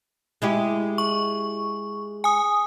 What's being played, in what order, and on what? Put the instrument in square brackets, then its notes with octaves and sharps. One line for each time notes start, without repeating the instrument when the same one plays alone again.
[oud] G#3 E4 G4
[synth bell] C#6
G#5 D#6